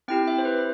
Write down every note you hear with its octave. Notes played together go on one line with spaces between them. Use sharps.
C4 E4 G4 G5
E5
C5
B4